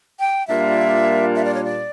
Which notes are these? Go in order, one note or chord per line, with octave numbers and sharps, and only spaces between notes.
G5
A#2 G3 A#3 D4 F4 E5
E5
D5
C#5
D5